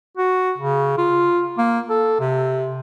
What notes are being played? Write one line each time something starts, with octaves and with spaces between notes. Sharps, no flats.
F#4
C#3
F4
A#3
A4
C3